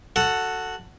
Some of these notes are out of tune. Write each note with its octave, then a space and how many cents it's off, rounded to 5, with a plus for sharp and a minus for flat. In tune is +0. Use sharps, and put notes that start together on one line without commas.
F#4 +0 A4 +10 F#5 +0